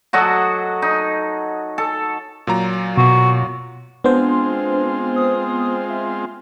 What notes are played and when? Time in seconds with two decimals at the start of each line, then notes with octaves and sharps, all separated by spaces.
0.13 F#3 F#4 A4 D#5
0.82 D#4
1.78 A4
2.47 A#2 F#3 A#5
2.97 B2 F#4
4.04 G#3 B3 C4 D4 F4 C5
5.16 D#6
5.89 E5